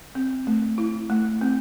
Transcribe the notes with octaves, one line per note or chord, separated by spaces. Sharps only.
C4
A3
E4
A3
C4